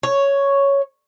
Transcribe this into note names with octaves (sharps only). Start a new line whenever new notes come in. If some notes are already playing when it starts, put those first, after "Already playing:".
C#5